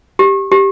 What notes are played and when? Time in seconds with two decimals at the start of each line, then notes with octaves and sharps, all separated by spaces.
0.19 G4
0.52 G4